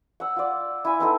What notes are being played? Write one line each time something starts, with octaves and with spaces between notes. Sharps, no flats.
F#5 E6
F4 D5
E4 G#5
B3 C4 D#4 A4